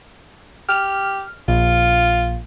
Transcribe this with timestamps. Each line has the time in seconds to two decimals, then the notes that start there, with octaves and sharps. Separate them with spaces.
0.69 G4 F6
1.48 A#1 F4